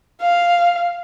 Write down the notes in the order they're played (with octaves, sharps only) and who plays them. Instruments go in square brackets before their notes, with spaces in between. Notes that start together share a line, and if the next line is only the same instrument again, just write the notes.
[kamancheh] F5